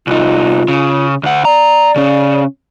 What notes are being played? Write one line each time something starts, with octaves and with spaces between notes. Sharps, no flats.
C2 D#4 F4
C#3
D2 F#5
D5 A#5
C#3 C#4